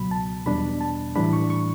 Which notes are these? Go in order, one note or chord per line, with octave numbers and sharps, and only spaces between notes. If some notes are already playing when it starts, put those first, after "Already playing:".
Already playing: C#2 B2 F#3 B5
A5
E2 B2 G3 D4 B5
A5
A2 E3 G3 D4 B5
C#6
C#6